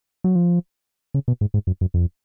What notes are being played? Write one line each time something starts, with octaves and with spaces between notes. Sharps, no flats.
F#3
F3
C#3
B2
G#2
G#2
F#2
F#2
F2